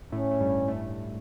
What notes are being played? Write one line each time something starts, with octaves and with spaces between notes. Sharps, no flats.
A2 A3 C#4
A3
G2 G3
A2 A3